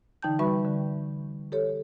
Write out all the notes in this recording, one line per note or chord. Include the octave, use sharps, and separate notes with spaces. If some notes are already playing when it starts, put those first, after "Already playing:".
D3 E3 D#4 G5 A5 G6
G3 F#4 B4 E5 B5 C#6
D3
G4 A4 C#5